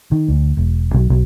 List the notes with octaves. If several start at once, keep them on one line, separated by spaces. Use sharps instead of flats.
D#3
D2
E1
B1
B1